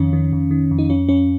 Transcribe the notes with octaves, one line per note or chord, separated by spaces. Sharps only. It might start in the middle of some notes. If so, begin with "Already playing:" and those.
Already playing: F2 D#3 C#4
D#3
F2
D#3
F2
D#4
F2 C#4
F2 C#4